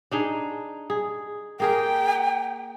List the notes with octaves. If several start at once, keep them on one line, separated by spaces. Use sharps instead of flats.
D4 D#4 G#4
G#4
A#3 G#4 A#4 G5